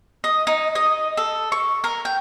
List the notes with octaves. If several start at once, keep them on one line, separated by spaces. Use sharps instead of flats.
D#5
D#4
D#5
A4
C#6
A#4
G5